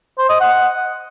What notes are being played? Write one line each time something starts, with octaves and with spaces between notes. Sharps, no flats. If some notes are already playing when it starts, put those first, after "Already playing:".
C5
D#5
F#5